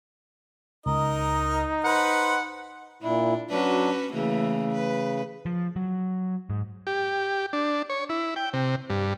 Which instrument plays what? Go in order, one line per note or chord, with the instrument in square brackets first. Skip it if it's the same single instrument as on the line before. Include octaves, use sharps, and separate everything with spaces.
[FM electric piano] C#2 [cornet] D#4 [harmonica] A#4 D#5
[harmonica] B4 C5 [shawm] F#5 [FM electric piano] C#7
[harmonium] A#2 E4 [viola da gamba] D4
[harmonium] F#3 D4 [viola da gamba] C#4 F#4 B4
[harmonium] C#3 [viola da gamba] E3 A3 A#3
[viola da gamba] B4
[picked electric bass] F3
F#3
G#2
[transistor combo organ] G4
D4
C#5
E4
G5
C3
G2